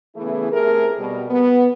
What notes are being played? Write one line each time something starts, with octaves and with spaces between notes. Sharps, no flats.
C#3 E3 A3 B3 E4 G#4
C3 A3 G#4 A#4
B2 G3
B3